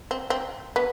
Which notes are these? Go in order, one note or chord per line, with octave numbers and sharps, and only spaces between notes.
C4
C4
B3